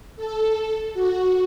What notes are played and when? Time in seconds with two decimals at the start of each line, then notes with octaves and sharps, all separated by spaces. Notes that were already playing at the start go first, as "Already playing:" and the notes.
0.16 A4
0.94 F#4